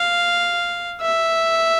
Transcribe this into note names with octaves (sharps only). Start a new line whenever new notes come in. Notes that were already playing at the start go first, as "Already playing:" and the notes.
Already playing: F5
E5